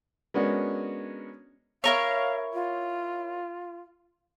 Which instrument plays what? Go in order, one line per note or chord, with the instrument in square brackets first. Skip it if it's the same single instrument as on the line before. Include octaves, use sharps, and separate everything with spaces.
[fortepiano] G#3 B3 C#4 D4 F#4 A#4
[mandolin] E4 A#4 C#5 [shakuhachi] F5
[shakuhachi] F4